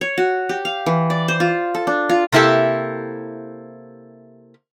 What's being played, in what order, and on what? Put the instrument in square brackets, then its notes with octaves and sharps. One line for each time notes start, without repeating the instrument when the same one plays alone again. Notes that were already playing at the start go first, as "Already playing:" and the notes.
[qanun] C#5
F#4
G4
F5
E3
D5
C5
F4
A4
D4
F4
[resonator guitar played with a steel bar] C3 A#3 E4 G4 A4